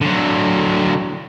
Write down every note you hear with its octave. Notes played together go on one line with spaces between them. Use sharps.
D3 F#3